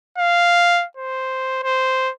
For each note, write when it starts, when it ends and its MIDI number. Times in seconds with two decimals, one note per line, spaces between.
0.18 0.85 77
0.97 1.62 72
1.63 2.11 72